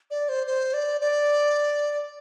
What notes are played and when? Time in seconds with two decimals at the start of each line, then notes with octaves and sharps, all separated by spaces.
0.11 D5
0.29 C5
0.47 C5
0.73 D5
1.01 D5